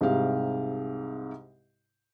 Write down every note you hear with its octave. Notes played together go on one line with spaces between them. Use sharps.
C2 G#2 C3 G4 F5